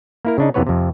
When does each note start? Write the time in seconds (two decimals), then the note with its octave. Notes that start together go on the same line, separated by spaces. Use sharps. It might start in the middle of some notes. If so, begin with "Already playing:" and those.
0.25 A#3 E4 A#4
0.38 C#3 D4 D#4
0.54 F2 C3 E3 B3 B4 C#5
0.67 F2 C3